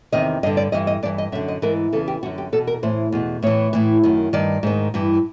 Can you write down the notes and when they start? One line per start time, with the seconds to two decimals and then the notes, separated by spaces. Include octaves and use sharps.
0.12 E2 C3 D#3 D#5
0.43 G2 D#5
0.46 D3
0.57 D5
0.72 G2 E3 D#5
0.87 D#5
1.03 G2 E3 D5
1.18 D#5
1.32 F#2 E5
1.35 D3
1.48 D#5
1.62 G#2 E3 A#4
1.93 E2 C#3 E3 A4
2.08 G4
2.23 D3 F#4
2.26 F#2
2.38 G4
2.52 E2 B2 A4
2.67 A#4
2.83 A2 E3 C5
3.12 E2 B2
3.42 A2 E3 C#5
3.73 A2 E3
4.03 F#2 D#3
4.33 G2 D#3 D5
4.63 G#2 D#3
4.94 G2 E3